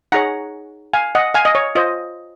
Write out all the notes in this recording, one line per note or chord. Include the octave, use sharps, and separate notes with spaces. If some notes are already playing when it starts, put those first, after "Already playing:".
D#4 G#4 C#5 F#5 A#5
F5 G#5
D#5 F#5
F5 G#5
D#5
C#5
F4 C5 D#5